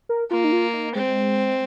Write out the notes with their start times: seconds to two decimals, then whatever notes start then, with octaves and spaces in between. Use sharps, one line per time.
0.09 A#4
0.31 A#3 F4
0.44 D#4
0.52 F4
0.73 D#4
0.95 G#3 C4